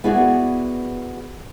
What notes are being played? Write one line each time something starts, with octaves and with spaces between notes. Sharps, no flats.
B3 E4 F#4 G#4 B4 D5